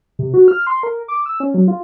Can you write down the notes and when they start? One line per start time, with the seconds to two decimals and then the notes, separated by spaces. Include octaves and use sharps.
0.19 C3
0.34 F#4
0.48 F6
0.67 C6
0.83 A#4
1.08 D6
1.26 E6
1.40 C#4
1.54 F#3
1.68 F4